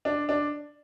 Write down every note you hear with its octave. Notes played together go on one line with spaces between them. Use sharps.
D4
D4